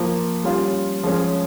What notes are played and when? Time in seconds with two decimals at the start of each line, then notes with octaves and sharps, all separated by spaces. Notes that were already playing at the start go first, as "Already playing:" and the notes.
Already playing: F3 A#3 F4
0.44 G3 C#4 F4
1.03 F3 G#3 C#4